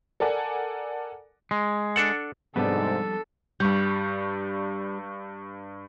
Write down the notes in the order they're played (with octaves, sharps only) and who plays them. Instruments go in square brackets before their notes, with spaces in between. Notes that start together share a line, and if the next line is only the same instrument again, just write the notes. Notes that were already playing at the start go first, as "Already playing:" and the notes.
[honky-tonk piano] A4 A#4 D5 F#5 G#5
[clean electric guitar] G#3
[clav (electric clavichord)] D4 A4 F#5
[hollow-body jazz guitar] F2 G3 [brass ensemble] G#2 C3 [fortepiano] B3 D4 [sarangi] A4
[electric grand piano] G2 C#6 G6 [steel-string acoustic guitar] G3